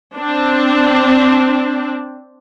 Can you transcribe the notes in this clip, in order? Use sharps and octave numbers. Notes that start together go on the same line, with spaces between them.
C4 D4